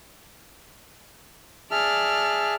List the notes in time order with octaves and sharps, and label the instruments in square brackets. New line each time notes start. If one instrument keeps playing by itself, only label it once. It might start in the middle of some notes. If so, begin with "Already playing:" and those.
[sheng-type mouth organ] G#4 E5 A5 [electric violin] D5 F6